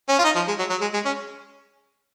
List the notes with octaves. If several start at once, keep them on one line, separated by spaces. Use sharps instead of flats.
C#4
F4
D#4
F3
G#3
F#3
F#3
G#3
G#3
C#4